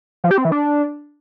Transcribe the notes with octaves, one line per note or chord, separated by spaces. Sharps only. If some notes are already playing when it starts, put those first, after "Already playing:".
F3
G4
C4
E3
D4